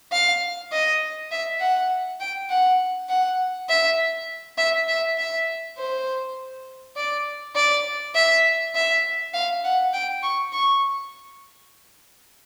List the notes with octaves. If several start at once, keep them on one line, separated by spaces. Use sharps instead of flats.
F5
D#5
E5
F#5
G5
F#5
F#5
E5
E5
E5
E5
C5
D5
D5
E5
E5
F5
F#5
G5
C#6
C#6